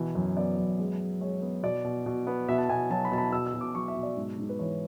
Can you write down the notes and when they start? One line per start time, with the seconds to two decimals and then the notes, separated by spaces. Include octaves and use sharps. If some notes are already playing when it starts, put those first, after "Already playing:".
Already playing: B2 E3
0.15 F#2
0.37 B3 D5
0.58 F#2
0.79 G#3
1.00 G#3
1.21 G#3 C#5
1.42 B3
1.63 B2 D5
1.84 B2
2.06 B2
2.27 B3
2.49 B2 E5
2.58 A5
2.69 B2 G#5
2.90 F#3 A5
3.05 B5
3.12 B2 A5
3.18 B5
3.32 B2 E6
3.46 E6
3.54 B2
3.61 D6
3.75 F#3 C#6
3.88 E5
3.96 B2
4.03 D5
4.17 G#2
4.38 G#2
4.49 B4
4.59 E3 C#5